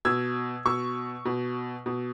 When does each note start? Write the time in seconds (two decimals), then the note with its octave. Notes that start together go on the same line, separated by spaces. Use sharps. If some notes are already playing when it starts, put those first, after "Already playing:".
0.05 B2 E6 G#6
0.65 B2 C#6 E6
1.25 B2
1.86 B2